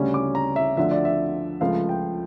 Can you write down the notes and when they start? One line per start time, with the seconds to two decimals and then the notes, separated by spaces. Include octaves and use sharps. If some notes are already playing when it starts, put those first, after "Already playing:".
Already playing: D2 C#3 G3 C#4
0.14 D6
0.35 A#5
0.56 E5
0.77 D2 D3 F3 E5
0.91 D5
1.05 E5
1.61 C#2 C#3 F3 A3 F5
1.89 G5